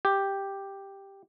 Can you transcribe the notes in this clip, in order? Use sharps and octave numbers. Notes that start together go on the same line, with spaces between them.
G4